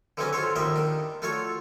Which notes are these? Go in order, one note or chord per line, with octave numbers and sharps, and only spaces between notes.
D3 E3 F#3 G#3 C4 C#4
F4 F#4 A4 C5 C#5
A#1 D#2 D#3 G3 D#5 E5
D#3 D4
A3 F4 F#4 A4 C#5